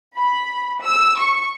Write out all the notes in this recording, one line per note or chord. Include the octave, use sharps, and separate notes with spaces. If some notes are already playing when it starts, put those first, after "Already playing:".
B5
E6
C#6